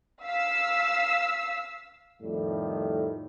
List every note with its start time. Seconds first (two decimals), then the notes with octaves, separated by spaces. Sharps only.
0.22 F5 E6 B6
2.22 F2 A2 D#3 G3